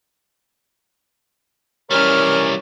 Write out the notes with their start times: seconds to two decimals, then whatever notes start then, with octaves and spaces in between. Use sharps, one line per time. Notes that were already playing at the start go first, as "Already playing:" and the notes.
1.91 E3 G3 C#4 A#4 C#5 F6